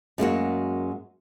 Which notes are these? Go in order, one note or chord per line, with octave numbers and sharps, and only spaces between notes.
F#2 G#3 A#3 F#4